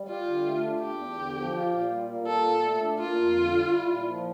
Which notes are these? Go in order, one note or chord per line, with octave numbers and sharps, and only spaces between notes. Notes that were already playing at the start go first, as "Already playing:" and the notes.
Already playing: G3
F4 G4
D3
A3
D4
E2 G4
E2
D3
F3
F4
A#2
G3
A#3
F4 A4
A#2
A3
D4
A#3 F4
F2
D3
G3
E4
A#2
F3